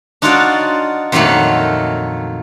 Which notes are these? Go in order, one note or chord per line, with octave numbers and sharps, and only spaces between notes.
D4 D#4 F4 F#4 C#5 D5
F2 A#2 D#3 F#3 A3 A#3